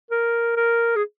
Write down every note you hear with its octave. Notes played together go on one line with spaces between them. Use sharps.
A#4
A#4
G#4